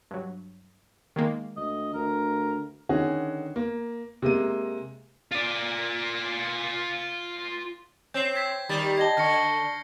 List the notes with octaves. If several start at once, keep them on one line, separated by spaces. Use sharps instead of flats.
G2 F#3
D#3 G#3 A#3
D2 D#5
D2 A#4
D3 D#3 C#4 F#4 G#4
A#3
C3 G#3 A#3 D#7
F4 D5
C4 C#5 G6 C7
G#6 B6 C7
D#3 G3 B5 A6
D#5 G5 A5 G#6 A#6 G7
D3 A5 C#6 F6 A#6 C#7